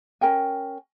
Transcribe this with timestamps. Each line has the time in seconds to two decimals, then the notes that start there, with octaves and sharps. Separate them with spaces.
0.21 C#4 A#4 G5 G#5